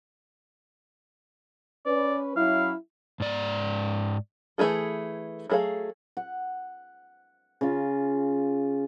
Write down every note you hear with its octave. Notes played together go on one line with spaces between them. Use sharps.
C#4 B4 D5
F#3 C#4 E4 F5
G#2 D5 A#5
E3 A3 E4 G#4 A4
F#3 A3 G#4 A4 F5
F#5
C#3 F4